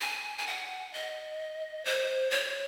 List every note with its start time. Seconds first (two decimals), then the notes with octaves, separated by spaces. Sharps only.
0.01 G#5
0.38 G#5
0.47 F#5
0.94 D#5
1.85 C5
2.31 C#5